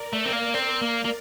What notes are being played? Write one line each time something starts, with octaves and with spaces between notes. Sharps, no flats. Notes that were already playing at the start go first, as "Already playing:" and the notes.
Already playing: A#4 D5
A3
C4
A#3
C4 A#4 D5
A#3
A#3